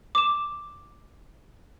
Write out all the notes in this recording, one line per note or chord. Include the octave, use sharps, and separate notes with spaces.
D6 E7